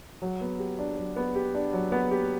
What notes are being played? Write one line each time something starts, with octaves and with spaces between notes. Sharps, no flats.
F#3
B3
G4
D4
F#3
B3
G4
D4
F#3
B3
G4